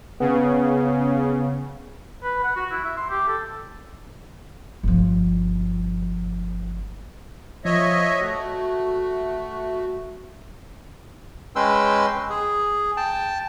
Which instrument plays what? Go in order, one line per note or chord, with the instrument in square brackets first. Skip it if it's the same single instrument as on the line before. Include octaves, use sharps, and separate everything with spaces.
[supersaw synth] C#3 [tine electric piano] B3
[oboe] B4
F#5
F#4
E4
E5
C6
G4
A4
[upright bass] G1 F3
[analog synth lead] F3 [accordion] C#5 D#5 E5
[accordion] A3 [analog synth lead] F#4
[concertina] G#3 C#4 B4 G5 C6 E6
G#4
G5 A5